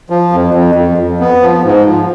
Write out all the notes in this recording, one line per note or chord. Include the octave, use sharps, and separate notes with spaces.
F3
F2
F2
F2
F2
B3
F3
G#2
F3